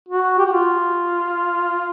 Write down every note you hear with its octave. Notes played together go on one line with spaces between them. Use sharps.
F#4
G4
F#4
F4